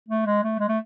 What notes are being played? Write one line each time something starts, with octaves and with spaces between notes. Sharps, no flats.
A3
G#3
A3
G#3
A3